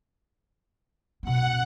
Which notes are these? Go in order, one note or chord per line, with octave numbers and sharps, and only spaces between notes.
B2 C#4 F#5